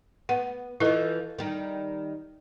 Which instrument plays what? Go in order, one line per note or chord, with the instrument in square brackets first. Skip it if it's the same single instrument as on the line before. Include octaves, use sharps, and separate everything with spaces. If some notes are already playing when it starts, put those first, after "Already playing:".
[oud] B3 [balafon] F#5
[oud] E3 F3 [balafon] E4 A4 D#5
[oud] D#3 G3